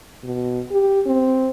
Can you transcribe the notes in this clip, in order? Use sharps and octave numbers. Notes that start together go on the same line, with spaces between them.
B2
G4
C4